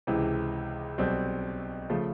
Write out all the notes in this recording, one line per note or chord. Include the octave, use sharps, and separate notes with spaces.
C#2 C3 E3 G#3
B1 B2 G3 C4
C#3 F3 A3